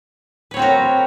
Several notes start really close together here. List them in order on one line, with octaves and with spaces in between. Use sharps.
B4 C#5 C4 F#4 A#4